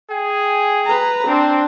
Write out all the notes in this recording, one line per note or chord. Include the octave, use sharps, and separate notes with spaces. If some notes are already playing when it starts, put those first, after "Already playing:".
G#4 G5 G#5
B4 A#5
C4 D4